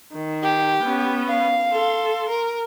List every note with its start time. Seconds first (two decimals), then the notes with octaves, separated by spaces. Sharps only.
0.13 D#3
0.43 G4
0.83 B3 C#4
1.29 F5
1.72 A4 C6
2.29 A#4